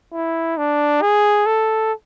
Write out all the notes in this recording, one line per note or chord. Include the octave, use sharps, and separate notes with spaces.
E4
D4
G#4
A4